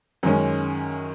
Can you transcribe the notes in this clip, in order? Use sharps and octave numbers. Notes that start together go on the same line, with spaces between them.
F#2 D#3 G#3 C#4